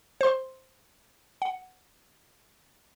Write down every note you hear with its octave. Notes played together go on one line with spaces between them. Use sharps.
C5 C6
F#5